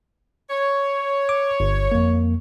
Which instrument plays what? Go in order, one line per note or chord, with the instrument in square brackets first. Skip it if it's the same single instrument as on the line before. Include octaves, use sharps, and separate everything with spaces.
[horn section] C#5
[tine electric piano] D6
G1
F2 A#3